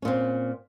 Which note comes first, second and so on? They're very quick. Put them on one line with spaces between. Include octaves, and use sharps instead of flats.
C#4 A#2 C4